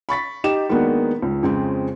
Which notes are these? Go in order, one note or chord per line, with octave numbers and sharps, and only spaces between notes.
B5 C#6 A6 B6
D#4 G4 E7
D#3 G#3 A#3 B3 D4 F#4
C#2
F2 C#3 G#3 C4